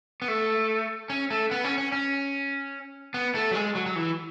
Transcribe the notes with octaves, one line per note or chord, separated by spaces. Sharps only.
B3
A3
C#4
A3
B3
C#4
C#4
C#4
B3
A3
F#3
G#3
F#3
F#3
E3